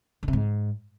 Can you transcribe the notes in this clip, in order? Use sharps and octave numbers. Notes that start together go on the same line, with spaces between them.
D3
C3
G#2